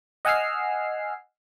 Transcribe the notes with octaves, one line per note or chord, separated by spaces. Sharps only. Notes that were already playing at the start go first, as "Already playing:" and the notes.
D#5 F#5 G#5 E6 F6 C7